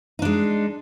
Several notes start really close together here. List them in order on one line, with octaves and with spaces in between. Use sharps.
D#4 D4 G#3